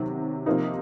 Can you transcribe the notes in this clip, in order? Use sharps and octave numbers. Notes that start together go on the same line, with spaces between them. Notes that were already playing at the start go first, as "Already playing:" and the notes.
Already playing: C3 D#3 F#3
C3 F3 A#3 D#4